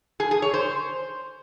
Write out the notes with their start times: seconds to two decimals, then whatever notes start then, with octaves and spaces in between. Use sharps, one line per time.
0.20 G#4
0.31 G#4
0.42 C#5
0.54 C5